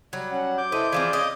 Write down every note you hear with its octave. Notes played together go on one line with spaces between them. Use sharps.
F#3 G3
C#4 F#5
D6 G6
E4 A4 B4 C5 D#5
E3 F3 C4 G#4 D5 F5
C#4 D#5